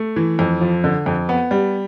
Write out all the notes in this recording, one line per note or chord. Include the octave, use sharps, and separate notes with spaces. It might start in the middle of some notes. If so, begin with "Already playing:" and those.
Already playing: A3
E3
F2
F3
D3
F2
B3
G3